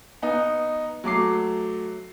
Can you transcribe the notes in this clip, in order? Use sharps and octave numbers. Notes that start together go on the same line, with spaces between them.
B3 D#4
F#3 A3 D6 C7